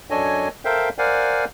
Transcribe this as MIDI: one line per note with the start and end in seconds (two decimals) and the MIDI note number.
0.10 0.48 42
0.10 0.48 62
0.10 0.48 69
0.10 0.48 73
0.10 0.48 75
0.10 0.48 80
0.65 0.89 69
0.65 0.89 70
0.65 0.89 72
0.65 0.89 76
0.65 0.89 77
0.65 0.89 79
0.98 1.45 70
0.98 1.45 72
0.98 1.45 74
0.98 1.45 77
0.98 1.45 78
0.98 1.45 80